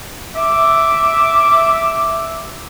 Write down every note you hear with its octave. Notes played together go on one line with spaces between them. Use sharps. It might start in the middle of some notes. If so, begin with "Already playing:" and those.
E5 D6